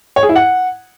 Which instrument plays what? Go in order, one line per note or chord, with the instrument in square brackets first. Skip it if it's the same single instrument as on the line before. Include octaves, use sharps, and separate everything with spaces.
[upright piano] C#5
G#4
E4
F#5